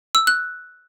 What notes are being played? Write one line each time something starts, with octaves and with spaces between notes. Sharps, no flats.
E6
F#6